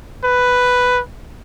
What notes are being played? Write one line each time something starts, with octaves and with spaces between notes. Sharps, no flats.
B4